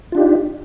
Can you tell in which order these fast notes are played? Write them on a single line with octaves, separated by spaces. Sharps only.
F4 D4 G4 D#4